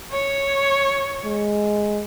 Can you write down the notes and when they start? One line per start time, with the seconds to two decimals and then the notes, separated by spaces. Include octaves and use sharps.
0.11 C#5
1.25 G#3